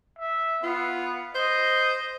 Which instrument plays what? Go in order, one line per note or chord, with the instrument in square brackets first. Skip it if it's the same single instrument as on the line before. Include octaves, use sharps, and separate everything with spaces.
[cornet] E5
[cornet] B3 [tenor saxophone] F4
[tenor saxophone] C5 [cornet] D#5